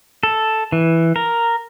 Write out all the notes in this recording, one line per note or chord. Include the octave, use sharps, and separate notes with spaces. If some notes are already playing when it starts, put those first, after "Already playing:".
A4
E3
A#4